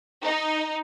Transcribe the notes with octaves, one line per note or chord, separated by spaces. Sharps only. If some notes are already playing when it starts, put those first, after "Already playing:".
D#4